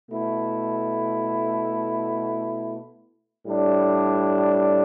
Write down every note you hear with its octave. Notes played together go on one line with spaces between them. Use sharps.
B2 A3 E4
A2 G3 D4